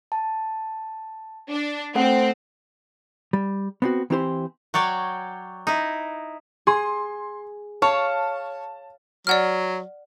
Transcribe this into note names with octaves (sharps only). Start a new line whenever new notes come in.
A5
D4
A3 C4 A4 F#5
G3
B3 C4 F#4
E3 C4 E4 G4 B4 C5
F#3 C#5 D5 G5
D#4 E4
G#4 C6
C#5 F5 A5
F#3 D5 F#5 F6